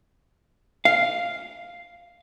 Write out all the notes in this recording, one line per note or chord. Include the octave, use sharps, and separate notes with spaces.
F5